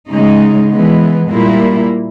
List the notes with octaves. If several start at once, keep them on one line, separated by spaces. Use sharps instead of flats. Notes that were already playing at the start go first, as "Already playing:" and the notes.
C#3 G#3 D#4
E3 G#3 B3
A#2 G3 A#3 E4